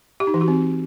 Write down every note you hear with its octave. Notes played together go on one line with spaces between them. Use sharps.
G4
D#4
E3
F#4
C4